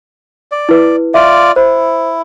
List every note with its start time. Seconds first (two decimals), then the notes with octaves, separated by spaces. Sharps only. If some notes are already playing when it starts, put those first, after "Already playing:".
0.52 D5
0.69 E4 B4
1.14 F4 D5 E5
1.56 E4 C5